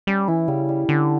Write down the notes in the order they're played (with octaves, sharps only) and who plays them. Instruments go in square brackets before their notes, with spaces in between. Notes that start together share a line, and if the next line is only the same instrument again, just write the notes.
[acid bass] G3 [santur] C#4
[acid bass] E3 [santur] E4
[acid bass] C#3 [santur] G3
[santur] G3
[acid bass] D3 [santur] C#4